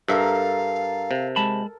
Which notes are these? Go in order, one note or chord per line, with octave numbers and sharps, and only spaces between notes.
G2 A4 A#4 E5 F5 A#5
C3
G#3 A5 B5